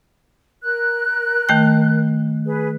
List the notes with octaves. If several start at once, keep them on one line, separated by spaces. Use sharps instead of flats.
A#4 F#6
D#3 A3 G5
G#4 B4